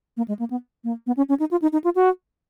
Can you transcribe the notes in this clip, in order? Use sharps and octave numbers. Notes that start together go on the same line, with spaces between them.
A#3
G#3
A#3
B3
A#3
B3
C#4
C#4
D#4
F4
D#4
D#4
F4
F#4